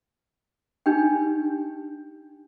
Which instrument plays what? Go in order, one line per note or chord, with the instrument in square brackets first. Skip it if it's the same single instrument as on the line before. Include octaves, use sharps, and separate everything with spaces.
[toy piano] D4 D#4 G4 G5